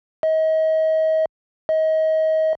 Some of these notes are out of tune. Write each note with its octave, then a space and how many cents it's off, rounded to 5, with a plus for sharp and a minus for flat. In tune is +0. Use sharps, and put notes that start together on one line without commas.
D#5 +35
D#5 +30